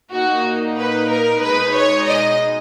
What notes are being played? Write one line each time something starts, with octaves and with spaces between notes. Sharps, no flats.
A#2 A#3 D#4 F#4
B4
A#4
B2 G#3 D#4 B4
C#5
D#5